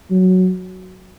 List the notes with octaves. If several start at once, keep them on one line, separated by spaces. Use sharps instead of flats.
F#3